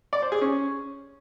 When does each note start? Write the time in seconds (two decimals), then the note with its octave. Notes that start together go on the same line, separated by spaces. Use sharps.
0.13 D5
0.22 C5
0.32 G#4
0.41 C#4